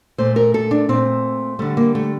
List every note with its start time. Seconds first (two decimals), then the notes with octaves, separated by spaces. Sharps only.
0.18 A#2 A3 C5
0.36 A#4
0.54 A4
0.71 D4
0.89 A#2 A3 C4
1.59 D3 G3 A3
1.77 A#3
1.95 A3